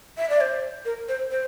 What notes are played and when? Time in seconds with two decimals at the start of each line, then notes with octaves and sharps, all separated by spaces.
0.18 E5
0.30 D5
0.41 C5
0.85 A#4
1.08 C5
1.31 C5